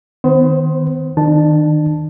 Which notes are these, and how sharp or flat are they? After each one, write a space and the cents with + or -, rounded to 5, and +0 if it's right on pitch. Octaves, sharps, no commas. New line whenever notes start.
D#3 +0 B3 +40 C5 +10
D#3 +0 D4 +40 A5 -5